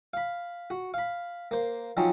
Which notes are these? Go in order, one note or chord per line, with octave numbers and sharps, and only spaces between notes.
F5 B5
F#4
F5 B5
A#3 C5
F3 F#3 C4 C#4 D#4